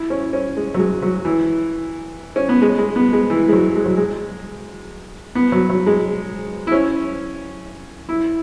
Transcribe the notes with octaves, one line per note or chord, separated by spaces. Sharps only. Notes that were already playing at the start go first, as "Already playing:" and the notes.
Already playing: E4
C#4
C#4
G#3
F#3
G#3
F#3
E3
C#4
B3
G#3
G#3
B3
G#3
E3
G#3
F#3
G#3
F#3
G#3
B3
F#3
F#3
G#3
E4
C#4
E4